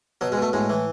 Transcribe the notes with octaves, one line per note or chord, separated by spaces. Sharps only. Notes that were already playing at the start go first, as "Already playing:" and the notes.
B2 F#3
G#3
B2 A3
A2 G#3
E3